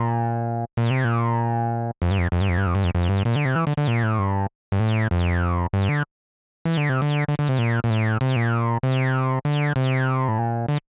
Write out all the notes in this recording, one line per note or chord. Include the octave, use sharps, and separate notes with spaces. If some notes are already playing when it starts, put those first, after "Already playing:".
Already playing: A#2
A#2
C3
A#2
F2
G2
F2
F2
G2
F2
G2
F2
G2
F2
F2
G2
A#2
D3
C3
E3
D3
D3
A#2
A2
G2
G2
A2
F2
G2
D3
E3
D3
C3
D3
D3
D3
C3
A#2
A#2
A2
C3
A#2
C3
D3
C3
A2
A#2
D3